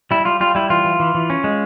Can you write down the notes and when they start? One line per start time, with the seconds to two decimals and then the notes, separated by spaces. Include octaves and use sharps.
0.11 G3 E4
0.25 G3 F4
0.40 G3 F4
0.55 G3 E4
0.70 E3 F4
0.85 E3
1.00 E3
1.15 E3
1.30 C#4
1.44 G#3